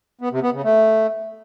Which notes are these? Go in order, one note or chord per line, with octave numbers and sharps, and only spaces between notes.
B3
C3
B3
C#3
A3